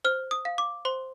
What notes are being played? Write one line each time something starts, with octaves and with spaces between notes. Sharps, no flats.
C5 F6
D#6
F5
D6
C5 C6